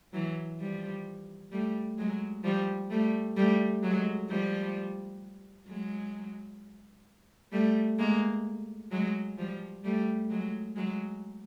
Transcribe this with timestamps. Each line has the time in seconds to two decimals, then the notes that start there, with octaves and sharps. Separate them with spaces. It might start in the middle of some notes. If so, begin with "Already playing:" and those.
0.13 E3 F#3
0.60 F3 G3
1.52 G3 A3
1.98 F#3 G#3
2.44 F3 G3
2.90 G3 A3
3.37 G3 A3
3.83 F#3 G#3
4.29 F3 G3
5.68 F#3 G#3
7.52 G3 A3
7.99 G#3 A#3
8.91 F#3 G#3
9.37 F3 G3
9.84 G3 A3
10.30 F#3 G#3
10.76 F#3 G#3